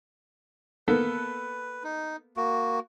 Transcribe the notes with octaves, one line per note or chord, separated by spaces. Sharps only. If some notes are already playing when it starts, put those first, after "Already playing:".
A#3 B3 A4 B4
D#4
A#3 F#4